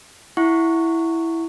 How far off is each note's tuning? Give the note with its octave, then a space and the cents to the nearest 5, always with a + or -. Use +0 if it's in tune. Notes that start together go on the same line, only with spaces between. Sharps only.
E4 +0 F#5 -15 C#6 +0